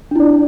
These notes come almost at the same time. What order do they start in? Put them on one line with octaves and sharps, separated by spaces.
D4 E4 D5